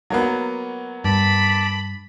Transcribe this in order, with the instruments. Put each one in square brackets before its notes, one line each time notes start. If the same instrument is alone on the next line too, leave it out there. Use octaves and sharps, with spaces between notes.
[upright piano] F#3 A#3 B3
[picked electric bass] G2 [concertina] A5 D6 [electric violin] B5